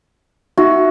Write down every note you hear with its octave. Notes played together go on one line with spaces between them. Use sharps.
D#4 F#4 E5